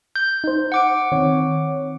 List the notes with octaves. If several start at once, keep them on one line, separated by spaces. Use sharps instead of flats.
G6
D#4 C5
F#5 D6 D7
D#3 C4 C#5